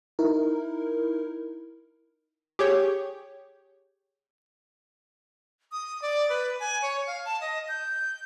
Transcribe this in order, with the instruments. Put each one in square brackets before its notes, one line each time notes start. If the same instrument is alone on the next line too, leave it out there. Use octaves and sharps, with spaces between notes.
[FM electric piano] D#4 E4 A#4
[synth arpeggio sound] G4 G#4 C#5 G5
[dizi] D#6
D5
B4
G#5
C#5
F5
A5
D#5
G6